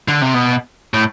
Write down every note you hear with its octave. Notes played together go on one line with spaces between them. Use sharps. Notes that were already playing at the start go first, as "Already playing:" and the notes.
D3
C3
B2
A2